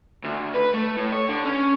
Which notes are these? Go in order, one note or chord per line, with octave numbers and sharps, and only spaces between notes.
D2
B4
A3
A2
C#5
D3
C#4